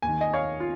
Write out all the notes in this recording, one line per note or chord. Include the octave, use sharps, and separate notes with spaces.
D#2 D#3 G#5
D#5 G#5
C#5 F5
F4